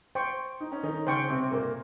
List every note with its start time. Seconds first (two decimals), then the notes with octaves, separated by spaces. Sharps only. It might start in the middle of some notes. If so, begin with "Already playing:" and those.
0.15 C5 G5 C#6
0.60 D#4
0.72 C#4
0.83 D#3 D#4
1.06 C#3 C#4 C5 G5 C#6
1.29 C3 C4
1.52 A#2 A#3